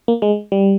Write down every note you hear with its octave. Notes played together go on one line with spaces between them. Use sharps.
A#3
G#3
G3